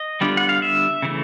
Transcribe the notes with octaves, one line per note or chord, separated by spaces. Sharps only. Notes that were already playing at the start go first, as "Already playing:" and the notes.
Already playing: D#5
D3 G3 B3 D4 F4
F#5
F5
E5
C#3 E3 A3